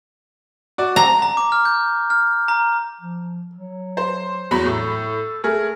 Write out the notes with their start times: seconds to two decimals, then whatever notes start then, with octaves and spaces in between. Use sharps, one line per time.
0.78 F#4 D5
0.96 A#5
1.22 A#5
1.37 D6
1.52 F6
1.65 G6
2.10 F6
2.48 A#5
3.01 F3
3.55 F#3
3.97 C5
4.51 E2 F#3 B5
4.65 A2 A4
5.44 A3 G#4 A#4